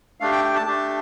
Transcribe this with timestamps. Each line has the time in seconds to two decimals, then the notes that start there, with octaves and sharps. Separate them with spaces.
0.20 A3 D4 G4 F5
0.32 G5
0.45 G5
0.56 A5
0.67 A3 D4 G4 A5